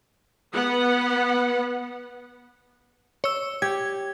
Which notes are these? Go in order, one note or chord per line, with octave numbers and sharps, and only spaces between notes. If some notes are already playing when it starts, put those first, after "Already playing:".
B3 F#5
C#5 E6
G4 G#6